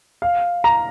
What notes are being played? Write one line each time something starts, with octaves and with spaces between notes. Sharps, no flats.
F5
A#5